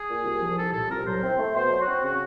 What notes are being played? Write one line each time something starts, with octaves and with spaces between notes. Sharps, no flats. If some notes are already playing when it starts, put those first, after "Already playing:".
Already playing: G#4
A#2
C2
F3
C2 A4
A#2 A4
C2 A#4
F#3 C5
C4
A3
B2 C5
F#3
F#4
C4
C#3 F#4